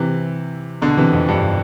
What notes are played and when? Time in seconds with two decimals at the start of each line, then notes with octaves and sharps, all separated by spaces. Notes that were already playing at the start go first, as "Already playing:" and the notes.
Already playing: C3 E3
0.82 B2 D3
0.97 C3 E3
1.13 F2
1.28 G2